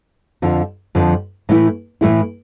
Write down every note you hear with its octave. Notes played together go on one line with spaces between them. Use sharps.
F2 D3 F3
F2 D3 F3
A2 E3 A3 E4
A2 E3 A3 E4